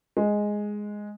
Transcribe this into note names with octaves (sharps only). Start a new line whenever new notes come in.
G#3